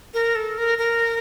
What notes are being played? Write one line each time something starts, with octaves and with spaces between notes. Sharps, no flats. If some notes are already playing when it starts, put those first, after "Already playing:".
A#4
A4
A#4
A#4